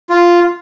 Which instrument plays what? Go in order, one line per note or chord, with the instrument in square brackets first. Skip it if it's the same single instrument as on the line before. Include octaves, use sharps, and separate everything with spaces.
[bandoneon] F4